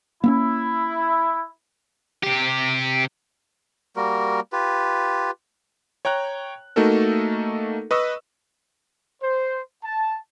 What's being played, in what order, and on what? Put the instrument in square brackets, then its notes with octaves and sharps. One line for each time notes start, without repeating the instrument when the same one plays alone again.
[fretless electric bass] A#3 B3 C#4 [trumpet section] E4
[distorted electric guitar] C3 G4
[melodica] G3 A#3 F#4 A#4
F4 G4 B4
[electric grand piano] C#5 G5 A#5 F#6
A3 A#3 D#4 F#4 A4 A#4
B4 D#5 C#6 D#6 E6
[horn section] C5
A5